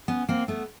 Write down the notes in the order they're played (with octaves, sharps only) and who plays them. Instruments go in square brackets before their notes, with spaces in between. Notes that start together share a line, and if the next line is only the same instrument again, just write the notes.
[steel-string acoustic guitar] B3 C#4
A#3 C4
A3 B3